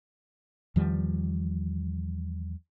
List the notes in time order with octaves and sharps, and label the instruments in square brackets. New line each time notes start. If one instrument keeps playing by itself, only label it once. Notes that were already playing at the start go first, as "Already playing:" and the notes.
[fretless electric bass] E2 D#3 F3 G3